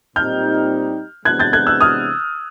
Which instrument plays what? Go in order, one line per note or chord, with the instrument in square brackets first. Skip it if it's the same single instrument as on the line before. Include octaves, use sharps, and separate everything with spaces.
[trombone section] A#2 G3 C4 D#4 G4 [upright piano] F6 G6
[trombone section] C3 E3 G#3 B3 D4 [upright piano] F#6 G#6
[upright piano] G6 A6
F#6 G#6
E6 F#6
D#6 F6